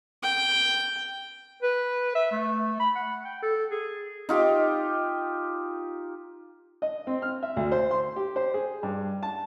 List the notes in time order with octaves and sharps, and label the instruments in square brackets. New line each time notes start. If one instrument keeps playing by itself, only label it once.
[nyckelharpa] G5
[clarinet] B4
E5
A3
B5
F#5
G5
A4
G#4
[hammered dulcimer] D#4 F4 G4 G5
[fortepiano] D#5
C4
F6
E5
D2
C5
C6
G4
C5
G#4
G2
A5